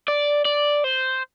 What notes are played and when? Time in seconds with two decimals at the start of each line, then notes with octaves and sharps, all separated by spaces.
0.08 D5
0.45 D5
0.84 C5